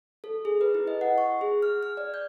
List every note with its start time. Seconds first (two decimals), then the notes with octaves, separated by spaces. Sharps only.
0.24 A4
0.45 G#4
0.61 B4
0.75 E4
0.87 D#5
1.01 F#5
1.18 C#6
1.41 G#4
1.62 F6
1.83 F6
1.97 D5
2.14 G6